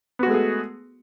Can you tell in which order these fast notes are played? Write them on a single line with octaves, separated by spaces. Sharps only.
B3 F#4 G#3 A3 G#4